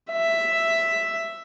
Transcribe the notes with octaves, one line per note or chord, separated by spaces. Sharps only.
E5